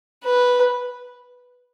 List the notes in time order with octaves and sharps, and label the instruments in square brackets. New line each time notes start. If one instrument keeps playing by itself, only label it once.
[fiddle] B4